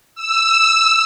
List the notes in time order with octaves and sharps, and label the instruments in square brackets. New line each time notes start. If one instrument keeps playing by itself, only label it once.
[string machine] E6